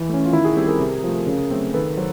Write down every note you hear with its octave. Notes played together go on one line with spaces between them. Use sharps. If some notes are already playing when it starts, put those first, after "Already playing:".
Already playing: E3
A3 C#4
F4
D#3 E4
F#4 G#4
G3 C4 G4 A4
G#4 A#4
C3
F3 A3
C#3
F#3 A3 C4
D#3 A4 B4
F#3 C5